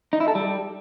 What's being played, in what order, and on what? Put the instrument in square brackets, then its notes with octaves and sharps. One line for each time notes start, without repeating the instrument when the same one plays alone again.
[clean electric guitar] D#4
E4
A4
G3